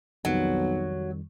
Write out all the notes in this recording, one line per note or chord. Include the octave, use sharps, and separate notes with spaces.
B1 F2 D#3 F#3 G3